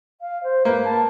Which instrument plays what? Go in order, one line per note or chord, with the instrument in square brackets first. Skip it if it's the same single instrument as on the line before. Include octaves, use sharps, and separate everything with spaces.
[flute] F5
C5
[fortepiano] A#3 [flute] B4
[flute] A5